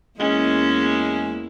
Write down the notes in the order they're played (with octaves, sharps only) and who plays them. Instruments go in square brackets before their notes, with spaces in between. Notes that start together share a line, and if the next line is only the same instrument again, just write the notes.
[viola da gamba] E2 A#3 E4 [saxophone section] G#3 [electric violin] C#4